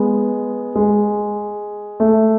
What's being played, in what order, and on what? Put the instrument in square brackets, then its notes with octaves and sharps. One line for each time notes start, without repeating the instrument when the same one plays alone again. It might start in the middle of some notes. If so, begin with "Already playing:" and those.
Already playing: [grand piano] G#3 B3
G#3
A3